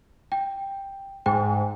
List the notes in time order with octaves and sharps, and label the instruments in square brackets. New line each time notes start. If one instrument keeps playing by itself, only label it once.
[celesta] G5
[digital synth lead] G#2 [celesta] G5